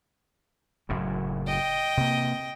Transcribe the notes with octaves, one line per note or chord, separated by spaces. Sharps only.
F#1 F#2 A2
D#5 G5
C3 A#3